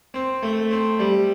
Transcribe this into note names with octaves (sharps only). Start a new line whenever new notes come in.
C4
A3
C4
G3